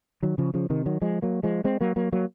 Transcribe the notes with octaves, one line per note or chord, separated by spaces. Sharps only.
D#3 F#3
C#3 F3
C#3 F3
C3 D#3
D#3 F#3
F3 G#3
F#3 A#3
F3 G#3
G#3 C4
F#3 A#3
F#3 A#3
F#3 A#3